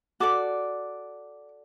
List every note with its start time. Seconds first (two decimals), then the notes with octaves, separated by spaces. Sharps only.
0.20 F#4 A4 D5 D6